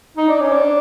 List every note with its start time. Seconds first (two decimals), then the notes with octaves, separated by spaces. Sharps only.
0.17 D#4
0.28 D4
0.40 C#4
0.52 D4